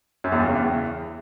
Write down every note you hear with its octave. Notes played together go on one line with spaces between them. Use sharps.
F#2
E2
G2
C#3
E2